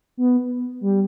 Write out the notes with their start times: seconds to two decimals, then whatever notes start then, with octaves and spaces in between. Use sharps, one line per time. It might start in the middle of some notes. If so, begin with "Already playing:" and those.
0.17 B3
0.81 G3